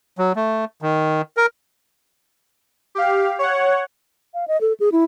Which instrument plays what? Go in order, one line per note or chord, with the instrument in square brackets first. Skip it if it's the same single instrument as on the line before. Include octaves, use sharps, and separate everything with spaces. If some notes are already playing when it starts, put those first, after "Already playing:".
[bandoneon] F#3
A3
D#3
A#4
[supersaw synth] G4 F5
C#5 F#5
[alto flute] F5
D#5
A4
G#4
E4